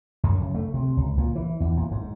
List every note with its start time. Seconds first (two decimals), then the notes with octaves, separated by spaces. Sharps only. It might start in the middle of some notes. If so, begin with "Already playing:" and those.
0.23 F#2
0.41 C#3
0.54 A3
0.74 C3
0.97 C#2
1.18 A#2
1.35 E3
1.60 E2
1.77 A#2
1.91 G#2